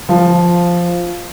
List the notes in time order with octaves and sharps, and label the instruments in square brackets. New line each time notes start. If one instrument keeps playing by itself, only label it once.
[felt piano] F3